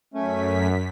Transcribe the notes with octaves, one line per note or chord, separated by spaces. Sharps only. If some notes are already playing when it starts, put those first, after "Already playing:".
F#2 A3 C#4 B6